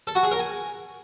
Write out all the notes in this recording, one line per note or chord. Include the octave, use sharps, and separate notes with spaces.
A4
F#4
G#4
A#4
G#5